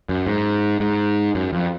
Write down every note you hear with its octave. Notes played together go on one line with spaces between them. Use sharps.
F#2
G#2
G#2
F#2
F2